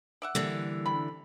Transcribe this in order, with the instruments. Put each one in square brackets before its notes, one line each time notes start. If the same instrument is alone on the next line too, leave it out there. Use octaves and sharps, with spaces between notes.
[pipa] D5 E5 F#5
[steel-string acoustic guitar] D3 E3 [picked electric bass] G3 A#3 D4
[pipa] C3 B5